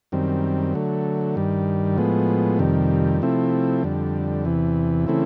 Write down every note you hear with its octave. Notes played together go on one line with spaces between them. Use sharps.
F#2 D#3 G3 C4
D3 F#3 A3
G2 D#3 G3
A2 F3 G#3 B3
F2 C3 D#3 G3
C3 F3 A3 C4 E4
F2 D3 G3
E2 C3 E3
C#3 E3 A3 C4 E4